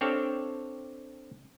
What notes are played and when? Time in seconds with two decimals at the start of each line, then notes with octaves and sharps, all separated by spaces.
0.01 C4 D4 G4 A4 C#5 F5